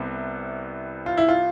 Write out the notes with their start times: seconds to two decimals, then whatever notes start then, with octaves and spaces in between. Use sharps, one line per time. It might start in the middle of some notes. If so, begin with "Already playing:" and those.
Already playing: C2 C3 B3
1.06 F4
1.17 E4
1.29 F4